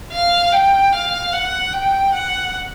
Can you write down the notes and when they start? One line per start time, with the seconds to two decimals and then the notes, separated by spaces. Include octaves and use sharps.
0.12 F5
0.53 G5
0.93 F5
1.33 F#5
1.73 G5
2.14 F#5